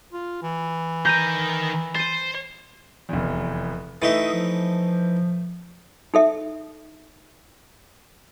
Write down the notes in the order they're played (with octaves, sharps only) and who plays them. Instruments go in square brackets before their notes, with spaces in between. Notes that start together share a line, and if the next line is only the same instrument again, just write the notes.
[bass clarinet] F4
E3
[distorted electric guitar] D#3 A#5 [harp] G6 D#7
[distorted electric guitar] C5 [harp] A6 D#7
[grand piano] F1 E2
[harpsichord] E3 D#4 E5 [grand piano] A3 [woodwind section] D#6
[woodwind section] F3
[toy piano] D#4 A4 E5